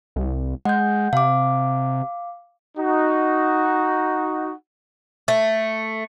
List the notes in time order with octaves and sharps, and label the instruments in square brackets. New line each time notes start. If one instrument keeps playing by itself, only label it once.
[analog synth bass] C2
[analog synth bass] G#3 [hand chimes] F#5 G6
[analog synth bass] C3 [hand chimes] F5 D6
[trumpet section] D#4 F#4
[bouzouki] A3